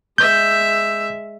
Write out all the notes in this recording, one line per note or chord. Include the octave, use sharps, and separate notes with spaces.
G#3 E5 G6